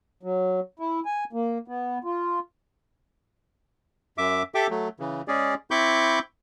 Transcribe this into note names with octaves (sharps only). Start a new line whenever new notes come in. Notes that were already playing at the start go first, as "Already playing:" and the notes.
F#3
E4
G#5
A#3
B3
F4
F#2 E5 D6
G4 A4 E5 G5 D6
F#3 A3
C#3 E3
G#3 C#4 G#4 D5
C4 E4 B5 C#6 D6 G6